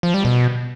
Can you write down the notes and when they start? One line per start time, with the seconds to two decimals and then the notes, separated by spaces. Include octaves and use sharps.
0.03 F3
0.14 G3
0.25 B2